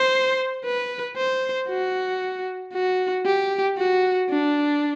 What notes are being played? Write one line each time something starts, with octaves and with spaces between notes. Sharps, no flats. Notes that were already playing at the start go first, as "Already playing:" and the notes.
Already playing: C5
B4
C5
F#4
F#4
G4
F#4
D4